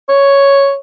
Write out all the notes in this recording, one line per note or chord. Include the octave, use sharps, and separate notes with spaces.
C#5